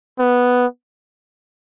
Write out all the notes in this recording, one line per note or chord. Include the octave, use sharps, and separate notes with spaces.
B3